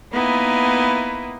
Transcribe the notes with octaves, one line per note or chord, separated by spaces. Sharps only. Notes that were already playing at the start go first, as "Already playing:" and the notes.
A#3 B3 D#4 E4